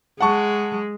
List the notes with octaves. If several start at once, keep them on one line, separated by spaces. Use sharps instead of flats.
G#3 F#5 A5 C#6